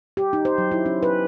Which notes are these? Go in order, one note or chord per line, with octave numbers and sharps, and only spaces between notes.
G4
D#4
C5
F#3
E4
C#4
B4